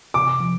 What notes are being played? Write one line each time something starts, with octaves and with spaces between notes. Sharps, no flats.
C3 D6
F3